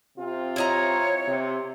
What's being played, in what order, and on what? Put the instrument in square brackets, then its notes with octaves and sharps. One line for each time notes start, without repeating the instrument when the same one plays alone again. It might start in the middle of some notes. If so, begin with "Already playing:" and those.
[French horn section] C3 C4 F4
[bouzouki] E4 D#5 A#5 [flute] C#5
[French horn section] C3